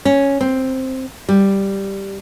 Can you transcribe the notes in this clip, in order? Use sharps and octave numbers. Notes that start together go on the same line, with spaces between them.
C#4
C4
G3